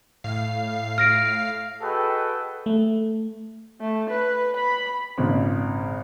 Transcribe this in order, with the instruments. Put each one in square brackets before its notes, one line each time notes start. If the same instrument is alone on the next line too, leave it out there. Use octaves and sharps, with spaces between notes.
[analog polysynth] A2 F5 C7
[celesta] F6 A#6 D7
[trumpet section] F#4 G#4 A4 B4 D#5 G5
[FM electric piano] A3
[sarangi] A3
B4
B5
[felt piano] G#1 A#2 C#3